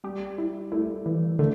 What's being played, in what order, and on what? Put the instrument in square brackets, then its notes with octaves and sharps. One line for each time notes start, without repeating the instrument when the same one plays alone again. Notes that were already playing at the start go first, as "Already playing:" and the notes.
[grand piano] G3 [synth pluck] G4
[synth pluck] E4
[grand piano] A3 [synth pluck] E4
[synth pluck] E3
[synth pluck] D3 [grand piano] A3